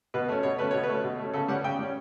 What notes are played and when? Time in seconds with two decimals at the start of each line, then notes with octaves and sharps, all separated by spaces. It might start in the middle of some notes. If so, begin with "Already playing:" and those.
0.14 B2 B4
0.28 A3 C#4
0.43 B2 C#5
0.58 A3 C#4 B4
0.71 B2 C#5
0.83 B4
0.89 A3 C#4
1.04 B2
1.19 A3 C#4
1.33 C#3 A4
1.48 G3 C#4 F#5
1.64 C#3 G5
1.79 G3 C#4